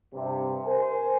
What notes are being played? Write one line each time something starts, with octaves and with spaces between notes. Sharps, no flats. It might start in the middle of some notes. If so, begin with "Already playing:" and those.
G2 C3
A#4 C5 G#5